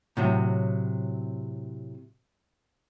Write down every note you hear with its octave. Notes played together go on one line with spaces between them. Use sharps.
A2 C3 F#3